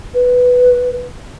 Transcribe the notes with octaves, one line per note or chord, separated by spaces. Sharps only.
B4